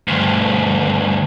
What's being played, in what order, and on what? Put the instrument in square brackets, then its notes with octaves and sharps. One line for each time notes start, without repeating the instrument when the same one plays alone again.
[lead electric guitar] D2 G2